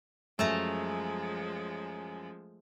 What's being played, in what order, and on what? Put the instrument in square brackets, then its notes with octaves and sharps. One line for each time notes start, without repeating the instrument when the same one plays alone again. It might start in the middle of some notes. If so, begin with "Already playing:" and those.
[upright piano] F#2 [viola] F3 G#3 [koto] A3 A5 A#5